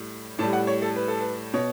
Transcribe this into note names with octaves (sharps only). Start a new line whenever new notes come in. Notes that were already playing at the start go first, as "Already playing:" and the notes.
Already playing: A2 G3
A2 G3 A5
F#5
C#5
A4
B4
A4
B4
B2 C#5